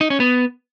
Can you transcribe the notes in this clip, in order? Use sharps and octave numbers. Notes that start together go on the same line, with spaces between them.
D#4
C#4
B3